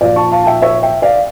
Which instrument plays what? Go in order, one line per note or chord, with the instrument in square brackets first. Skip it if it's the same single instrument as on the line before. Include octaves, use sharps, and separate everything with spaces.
[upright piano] A#2 F3 D5 F5
A5 C#6
F5 A5
A5
E5 G5
C#5 E5
E5 G5
D5 F5